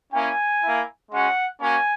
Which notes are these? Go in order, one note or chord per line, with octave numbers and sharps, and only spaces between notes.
A#3 C#4 E4 G#5
A#3 E4
G#3 C#4 F#4 F#5
A#3 C#4 F#4 G#5